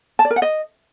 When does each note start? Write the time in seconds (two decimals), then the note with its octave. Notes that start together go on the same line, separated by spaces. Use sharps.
0.19 A5
0.25 D5
0.30 A#4
0.36 F#5
0.42 D#5